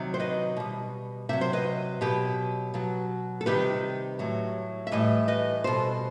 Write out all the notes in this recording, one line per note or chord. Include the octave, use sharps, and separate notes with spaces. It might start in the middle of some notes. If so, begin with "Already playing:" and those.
Already playing: C3 D#3 F#3
C5
B4 D#5
B2 G3
C3 F#3 C5 E5
C5
B4 D#5
B2 F#3 G4 B4
B2 F#3
A4
C3 D#3 G3 G4 B4
A2 F#3
E5
A2 E3 G3 B4 D#5
B4 D#5
B2 G3 A4 C5